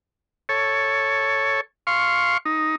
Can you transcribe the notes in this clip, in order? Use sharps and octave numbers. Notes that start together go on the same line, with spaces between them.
A4 C#5
F5 C6 C#6
D#4